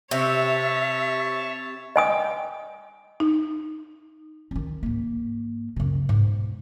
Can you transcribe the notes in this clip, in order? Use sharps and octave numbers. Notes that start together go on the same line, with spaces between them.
C3 C#5 E5 A5
D#5 G5 G#5 D#6
D#4
D#3 C#4
G#2 A#3
F#2 C#3
G#2 B2